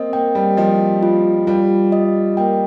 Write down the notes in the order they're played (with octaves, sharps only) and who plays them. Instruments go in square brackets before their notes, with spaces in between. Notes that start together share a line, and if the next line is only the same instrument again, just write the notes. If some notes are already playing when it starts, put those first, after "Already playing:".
Already playing: [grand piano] A#3 C4 [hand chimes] D#5
[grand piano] A#3 [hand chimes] G5
[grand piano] G3
[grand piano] F3 [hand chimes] D#5
[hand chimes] F4
[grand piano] G3 [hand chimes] F4
[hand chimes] D#5
[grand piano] A#3 [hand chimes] G5